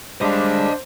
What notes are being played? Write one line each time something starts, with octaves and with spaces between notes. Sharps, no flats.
G3 G#3 D4 C5 D#5 F5